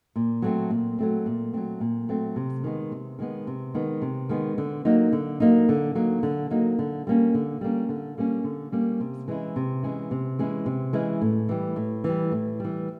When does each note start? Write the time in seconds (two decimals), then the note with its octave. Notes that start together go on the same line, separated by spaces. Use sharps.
0.16 A#2
0.42 F#3 A3 C4
0.70 A#2
0.98 F#3 A3 C4
1.26 A#2
1.53 F#3 A3 C4
1.80 A#2
2.09 F#3 A3 C4
2.36 C3
2.64 D#3 G#3 B3
2.91 C3
3.19 D#3 G#3 B3
3.47 C3
3.74 D#3 G#3 B3
4.02 C3
4.29 D#3 G#3 B3
4.58 D3
4.85 F#3 A#3 D#4
5.12 D3
5.40 F#3 A#3 D#4
5.69 D3
5.95 F#3 A#3 D#4
6.23 D3
6.50 F#3 A#3 D#4
6.79 D3
7.07 G3 A#3 C#4
7.34 D3
7.61 G3 A#3 C#4
7.89 D3
8.18 G3 A#3 C#4
8.44 D3
8.72 G3 A#3 C#4
9.00 C3
9.28 E3 G#3 C#4 E4
9.56 C3
9.83 E3 G#3 C#4 E4
10.11 C3
10.39 E3 G#3 C#4 E4
10.66 C3
10.93 E3 G#3 C#4 E4
11.22 A2
11.49 E3 G3
11.76 A2
12.04 E3 G3
12.31 A2
12.60 E3 G3